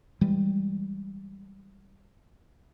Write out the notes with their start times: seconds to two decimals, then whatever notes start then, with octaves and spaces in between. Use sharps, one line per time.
0.21 E3 G3 G#3